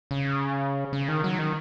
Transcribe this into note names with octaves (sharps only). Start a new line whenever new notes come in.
C#3
C#3
D#3
F#3
D#3